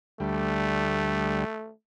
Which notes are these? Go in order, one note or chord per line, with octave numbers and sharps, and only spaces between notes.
D2 G3 A3